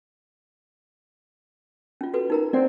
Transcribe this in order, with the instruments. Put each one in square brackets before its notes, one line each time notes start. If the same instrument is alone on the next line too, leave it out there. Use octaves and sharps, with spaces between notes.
[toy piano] C#4 F4
F#4 A4 B4
D#4 A#4 A#5
[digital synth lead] C4 [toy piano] D5 F#5